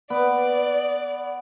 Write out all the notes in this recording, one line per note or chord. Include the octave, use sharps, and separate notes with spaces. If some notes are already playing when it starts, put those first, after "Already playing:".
B3 D5